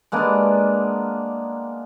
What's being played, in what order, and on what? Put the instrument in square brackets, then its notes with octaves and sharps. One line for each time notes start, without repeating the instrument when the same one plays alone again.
[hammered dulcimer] G#3 A#3 B3 D4